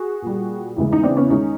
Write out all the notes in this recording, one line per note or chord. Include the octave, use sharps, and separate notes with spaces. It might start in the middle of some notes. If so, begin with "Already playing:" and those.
Already playing: F#4 G#4
A#2 G3
E2 C#3 E3 G#3
D#4
C4 D4
B3 C#4
D#3 G#3 C#4 D#4